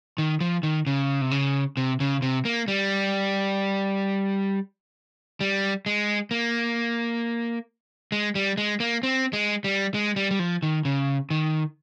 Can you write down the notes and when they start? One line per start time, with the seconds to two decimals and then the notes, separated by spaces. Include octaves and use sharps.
0.18 D#3
0.40 F3
0.63 D#3
0.87 C#3
1.21 C3
1.31 C#3
1.77 C3
2.00 C#3
2.22 C3
2.45 A#3
2.68 G3
5.41 G3
5.86 G#3
6.31 A#3
8.12 G#3
8.35 G3
8.57 G#3
8.80 A#3
9.03 C4
9.33 G#3
9.64 G3
9.94 G#3
10.16 G3
10.31 G3
10.39 F3
10.63 D#3
10.85 C#3
11.30 D#3